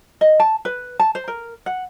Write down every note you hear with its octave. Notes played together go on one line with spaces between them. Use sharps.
D#5
A5
B4
A5
C5
A#4
F#5